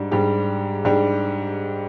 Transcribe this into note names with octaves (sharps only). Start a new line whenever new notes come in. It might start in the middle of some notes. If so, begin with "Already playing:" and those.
Already playing: G#2 G3 D4
G#2 G3 D4 G4
G#2 G3 D4 G4